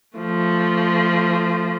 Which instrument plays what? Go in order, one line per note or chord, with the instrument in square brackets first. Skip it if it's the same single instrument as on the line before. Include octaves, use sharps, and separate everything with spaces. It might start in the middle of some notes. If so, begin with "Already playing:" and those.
[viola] F3 A3